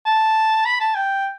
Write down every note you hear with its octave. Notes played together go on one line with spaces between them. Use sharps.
A5
B5
A5
G5